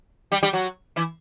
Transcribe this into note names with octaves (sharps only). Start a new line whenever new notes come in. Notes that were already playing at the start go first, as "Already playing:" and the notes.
G3 G4
G3 G4
F#3 F#4
E3 E4